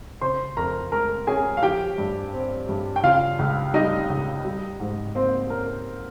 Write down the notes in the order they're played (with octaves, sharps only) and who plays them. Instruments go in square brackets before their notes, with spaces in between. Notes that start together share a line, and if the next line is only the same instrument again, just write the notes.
[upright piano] C#3 C5 C6
F2 A#4 A#5
G#3 A#4 A#5
C#4 G#4 G#5
F5
F3 G4 G5
G2
C4
G2
G5
C#3 F4 F5
C#2
G3 D#4 D#5
C#2
G3
G#2
A#3 C4 C5
C#4 A#4